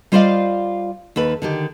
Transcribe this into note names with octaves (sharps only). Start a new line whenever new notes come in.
G3 F4 C5 D5 D#5 F5
D#2 A4 B4
D3 D#3 G4